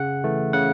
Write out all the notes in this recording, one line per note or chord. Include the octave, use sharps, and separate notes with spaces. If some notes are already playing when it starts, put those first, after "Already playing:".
Already playing: C#3 F#5
E3 A3
C#3 F#5